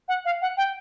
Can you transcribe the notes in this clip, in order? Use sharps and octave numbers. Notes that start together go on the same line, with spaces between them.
F#5
F5
F#5
G5